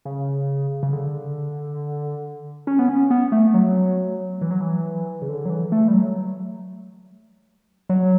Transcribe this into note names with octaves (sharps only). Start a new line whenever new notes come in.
C#3
C#3
D3
C#4
B3
C#4
B3
A3
F#3
E3
F#3
E3
C#3
D3
F#3
E3
A3
G3
F#3
F#3